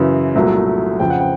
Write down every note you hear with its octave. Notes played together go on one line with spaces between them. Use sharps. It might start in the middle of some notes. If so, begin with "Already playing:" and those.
Already playing: F#2 C#3 E3
C2 A#2 F#3 A3
F2 C#3 F3 G5
F#5
G5